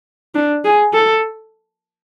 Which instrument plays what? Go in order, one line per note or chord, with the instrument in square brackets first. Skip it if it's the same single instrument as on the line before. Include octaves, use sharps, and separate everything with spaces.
[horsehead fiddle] D4
G#4
A4